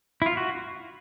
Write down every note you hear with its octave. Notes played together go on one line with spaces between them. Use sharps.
E4
F4
F#4